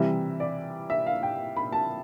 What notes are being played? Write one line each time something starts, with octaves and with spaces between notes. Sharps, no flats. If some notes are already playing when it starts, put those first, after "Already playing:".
Already playing: C3 E3 G3 E5
D5
E5
F5
G5
B5
A5